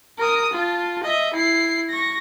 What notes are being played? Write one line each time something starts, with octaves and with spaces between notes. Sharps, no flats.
A#4 D#6
F4 A5
D#5 E5
E4 C7
C#6 A#6